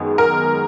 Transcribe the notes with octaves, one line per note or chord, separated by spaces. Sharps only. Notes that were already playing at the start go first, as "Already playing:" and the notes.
Already playing: F#2 D#3 G#3 B3
A#4